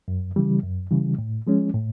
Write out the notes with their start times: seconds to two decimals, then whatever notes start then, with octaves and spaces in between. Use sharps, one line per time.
0.08 F#2
0.36 C#3 E3 G3
0.64 F#2
0.91 C#3 E3 G3
1.18 A2
1.47 F3 G#3 C#4
1.74 A2